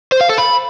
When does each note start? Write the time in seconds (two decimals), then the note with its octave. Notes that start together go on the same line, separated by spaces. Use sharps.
0.12 C5
0.21 F5
0.29 A4
0.38 B5